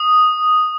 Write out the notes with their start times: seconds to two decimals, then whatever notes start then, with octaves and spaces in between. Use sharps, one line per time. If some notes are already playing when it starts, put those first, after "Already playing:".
Already playing: D#6